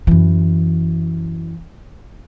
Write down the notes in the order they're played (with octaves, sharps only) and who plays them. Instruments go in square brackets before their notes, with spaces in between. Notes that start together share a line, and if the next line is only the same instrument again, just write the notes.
[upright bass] F#2 E3